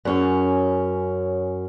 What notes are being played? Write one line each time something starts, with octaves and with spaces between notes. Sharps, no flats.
F#2 C#4 G#4